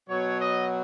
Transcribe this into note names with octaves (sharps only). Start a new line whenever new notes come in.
B2 F#3 C#5
D#5